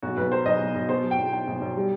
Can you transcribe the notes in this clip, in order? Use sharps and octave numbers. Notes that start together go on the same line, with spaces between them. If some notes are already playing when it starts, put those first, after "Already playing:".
B1 F#4
B1 B4
F#3 C5
B1 D#5
B1
B1
B2 C5
F#3
G5
B1
B1 G5
B1
B1
G3